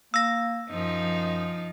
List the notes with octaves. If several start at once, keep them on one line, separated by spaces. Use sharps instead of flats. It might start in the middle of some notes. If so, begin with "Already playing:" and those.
A#3 E6 A#6
F#2 F3 D#4